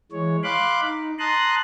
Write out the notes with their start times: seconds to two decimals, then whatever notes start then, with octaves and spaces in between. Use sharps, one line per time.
0.12 E3 G#3 C#5
0.44 F5 B5 C6 D6 F#6
0.81 D#4
1.19 A5 A#5 C6 D#6 F#6